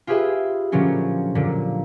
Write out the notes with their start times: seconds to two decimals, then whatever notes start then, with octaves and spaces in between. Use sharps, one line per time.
0.07 F4 G4 G#4 B4 E5
0.72 A#2 D3 F3 F#3 C#4
1.35 A#2 D3